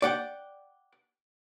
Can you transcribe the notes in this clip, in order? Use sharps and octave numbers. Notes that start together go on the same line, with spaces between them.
D5 F#5 G5